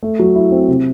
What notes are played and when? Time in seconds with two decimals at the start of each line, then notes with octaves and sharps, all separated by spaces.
0.03 A3
0.19 F#3
0.36 E4
0.52 C4
0.68 C3